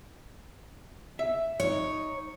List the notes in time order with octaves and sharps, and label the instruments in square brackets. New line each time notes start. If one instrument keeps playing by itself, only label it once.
[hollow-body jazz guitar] E5
[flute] D#4 [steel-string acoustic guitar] C#5